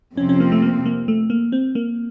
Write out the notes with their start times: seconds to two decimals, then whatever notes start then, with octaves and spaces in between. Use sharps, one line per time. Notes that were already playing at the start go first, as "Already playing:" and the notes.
0.17 F2 C3 F3 C4 C#4
0.29 C#4
0.40 A#3
0.52 A3
0.62 A#3
0.86 A#3
1.08 A3
1.30 A#3
1.52 C4
1.75 A#3